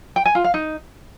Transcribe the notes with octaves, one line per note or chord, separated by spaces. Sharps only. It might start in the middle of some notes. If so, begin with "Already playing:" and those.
G5
G#5
F4
F5
D#4